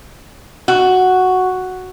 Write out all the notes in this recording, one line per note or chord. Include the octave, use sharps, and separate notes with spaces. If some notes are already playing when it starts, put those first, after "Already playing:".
F#4